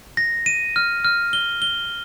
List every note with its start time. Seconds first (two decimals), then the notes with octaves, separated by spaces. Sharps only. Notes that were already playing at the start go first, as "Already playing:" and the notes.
0.17 A#6
0.46 D#7
0.76 F6
1.05 F6
1.33 G7
1.62 G7